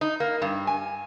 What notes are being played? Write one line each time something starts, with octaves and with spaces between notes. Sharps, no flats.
D#4
A#3
G2
G#5